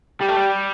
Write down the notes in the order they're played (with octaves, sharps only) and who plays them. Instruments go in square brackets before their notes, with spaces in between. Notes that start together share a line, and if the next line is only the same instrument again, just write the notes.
[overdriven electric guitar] G3 [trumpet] G4
[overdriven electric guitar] A3
G3